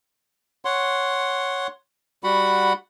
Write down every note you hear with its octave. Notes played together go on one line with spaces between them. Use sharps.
C#5 F#5 C6
G3 F#4 F#5 B5